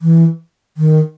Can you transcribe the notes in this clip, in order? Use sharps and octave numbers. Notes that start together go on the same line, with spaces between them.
E3
D#3